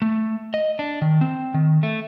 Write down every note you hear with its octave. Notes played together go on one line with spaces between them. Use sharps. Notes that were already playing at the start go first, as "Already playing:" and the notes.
A3
D#5
D4
D#3
C4
D#3
A3